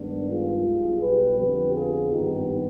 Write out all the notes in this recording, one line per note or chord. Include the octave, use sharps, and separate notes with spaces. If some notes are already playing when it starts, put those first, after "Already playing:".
Already playing: G2 D#3 G#3 B3 D4
F4 G#4
B1 B2 G3
G4 B4
F2 D3 F3 B3 G4 B4
F4 G#4
G#1 G2 D#3 B3 D#4 G4